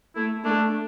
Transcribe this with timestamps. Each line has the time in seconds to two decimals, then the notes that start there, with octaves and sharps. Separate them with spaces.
0.16 A3 E4
0.45 A3 D4